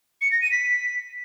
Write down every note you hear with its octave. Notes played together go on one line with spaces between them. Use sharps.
C#7
A#6
D#7
B6